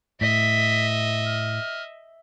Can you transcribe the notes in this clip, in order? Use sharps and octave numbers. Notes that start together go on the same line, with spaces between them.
A2 D#5 E5 B6
F6